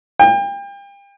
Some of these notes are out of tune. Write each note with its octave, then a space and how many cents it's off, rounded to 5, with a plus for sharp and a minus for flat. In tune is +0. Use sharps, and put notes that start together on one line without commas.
G5 +35